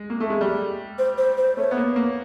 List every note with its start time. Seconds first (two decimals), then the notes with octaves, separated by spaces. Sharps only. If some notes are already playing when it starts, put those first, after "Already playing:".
Already playing: G#3
0.10 A#3
0.20 A3
0.30 G#3
0.41 G3
0.99 C5
1.18 C5
1.38 C5
1.57 A3 C#5
1.71 B3
1.77 A#3
1.96 A#3